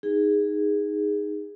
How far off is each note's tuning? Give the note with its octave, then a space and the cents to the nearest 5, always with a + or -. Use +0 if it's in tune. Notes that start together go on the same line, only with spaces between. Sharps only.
D#4 +0 G#4 -10